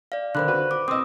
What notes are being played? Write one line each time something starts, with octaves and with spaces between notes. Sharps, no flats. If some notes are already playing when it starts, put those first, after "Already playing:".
D5 F5
D3 D#3 C5 B5 F#6
F#4 B4
D6
C4 D#5 D#6 E6